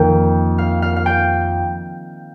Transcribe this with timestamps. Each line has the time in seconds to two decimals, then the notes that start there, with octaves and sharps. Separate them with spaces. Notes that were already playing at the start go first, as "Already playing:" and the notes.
Already playing: F2 D#3 A#3 G5
0.58 F5
0.82 F5
0.96 F5
1.06 G5